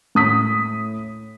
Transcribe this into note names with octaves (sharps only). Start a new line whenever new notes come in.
A2 D#6 B6